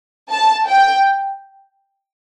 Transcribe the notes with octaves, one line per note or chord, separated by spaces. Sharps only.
A5
G5